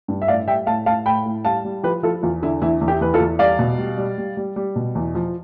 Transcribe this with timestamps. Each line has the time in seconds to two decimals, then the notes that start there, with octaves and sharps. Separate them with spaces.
0.08 G2
0.22 E5
0.28 A2 D5 F5
0.47 G3 E5 G5
0.67 A2 F5 A5
0.86 A2 F5 A5
1.06 A2 G5 B5
1.26 A2
1.45 G3 F5 A5
1.65 G3
1.83 F3 G4 B4
2.03 F3 F4 A4
2.23 E2 F4
2.42 D3 E4
2.62 E2 E4
2.81 E2
2.88 E4 G4
3.01 E2 B4
3.14 F4 A4
3.20 E2
3.39 G3 D5 F5
3.59 B2
3.78 G3
3.98 G3
4.18 G3
4.37 G3
4.56 G3
4.76 B2
4.95 E2
5.15 F3